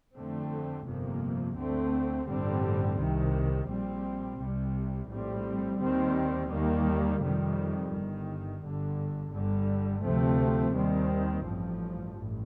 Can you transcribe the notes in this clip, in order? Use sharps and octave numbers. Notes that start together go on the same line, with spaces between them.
F2 D3 A3 C4
G1 F2 C3 F3 A#3
D2 D3 A3 C4
A1 G2 D3 G3 C4
C2 C3 D#3
A#1 A#2 G3 C4
C2 C3 G3
A#1 A2 G3 C4
D#2 D#3 G3 C4
D#2 D#3 G3 A#3
F2 C3 D#3 G3
G1 G2 D#3
G1 G2 D3
G1 G2 D3 G3
D2 C3 F3 A3 C4
D#2 D#3 G3 C4
A1 G2 F3
A1 G2